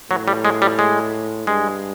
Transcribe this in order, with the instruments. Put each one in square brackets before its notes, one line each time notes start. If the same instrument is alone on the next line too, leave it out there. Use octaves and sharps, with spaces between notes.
[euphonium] A2 [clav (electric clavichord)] F#3
[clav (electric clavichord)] G3
G#3
G3
G#3
[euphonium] G2 [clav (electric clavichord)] G#3